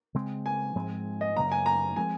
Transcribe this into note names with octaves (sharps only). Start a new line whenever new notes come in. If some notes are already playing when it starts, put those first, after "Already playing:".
C#3 G#3 C4
G#5
G#2 F3 G#3 C4
D#5
F#2 C#3 F#3 A#3 A#5
G#5
A#5
F3 G#3 C4 G#5